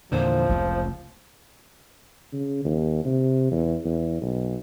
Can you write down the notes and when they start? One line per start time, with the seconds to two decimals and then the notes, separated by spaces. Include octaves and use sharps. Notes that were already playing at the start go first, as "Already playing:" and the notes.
0.12 E2 A#2 D3 F3 C5
0.49 F1 C#2 A3 F4
2.33 C#3
2.65 D#2
3.05 C3
3.51 E2
3.85 E2
4.21 B1